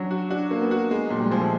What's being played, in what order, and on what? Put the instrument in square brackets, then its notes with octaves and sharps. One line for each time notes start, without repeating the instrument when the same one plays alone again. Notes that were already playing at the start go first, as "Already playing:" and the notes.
Already playing: [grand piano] F#3 D4 [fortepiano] C#4
[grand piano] F#4
[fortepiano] D4 [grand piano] F#4
[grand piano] A#3
[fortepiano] B3
[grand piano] F#4
G#3
[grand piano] A#2 [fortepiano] F#3
[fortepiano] G3
[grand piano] F3 [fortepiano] G#3
[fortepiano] A3